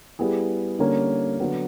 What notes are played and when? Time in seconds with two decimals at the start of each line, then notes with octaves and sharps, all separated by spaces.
0.19 G3 B3 E4 G#4
0.79 D3 G3 A#3 C#4
1.40 D3 F#3 B3